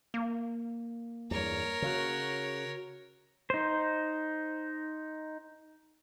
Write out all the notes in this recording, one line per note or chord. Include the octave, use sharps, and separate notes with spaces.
A#3
E2 G2 A#4 C#5
C#3 F#4
D#4 C5